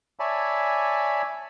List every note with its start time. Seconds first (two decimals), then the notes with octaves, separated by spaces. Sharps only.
0.19 C#5 D5 E5 G#5 A5 B5